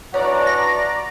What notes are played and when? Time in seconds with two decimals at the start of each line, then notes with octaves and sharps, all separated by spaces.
0.14 E3 D4 F#4 C#5 D5 A#5
0.47 A#6